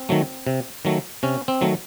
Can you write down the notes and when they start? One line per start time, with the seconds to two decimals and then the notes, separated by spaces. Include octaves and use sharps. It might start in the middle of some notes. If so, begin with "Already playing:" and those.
Already playing: C4
0.09 D#3 F#3 A3
0.47 C3
0.85 D#3 F#3 A3
1.23 C3 C#4
1.48 C4
1.61 D#3 F#3 A3